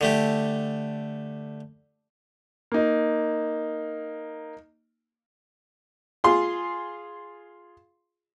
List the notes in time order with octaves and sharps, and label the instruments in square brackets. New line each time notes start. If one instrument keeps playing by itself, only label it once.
[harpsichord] D3 A3 G4
[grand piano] A#3 D#4
[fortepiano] F4 G#4 C6